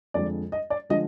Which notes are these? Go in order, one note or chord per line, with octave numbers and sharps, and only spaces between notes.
F2 D3 F3 G#3 D5
D#5
D5
D3 F3 G#3 D#5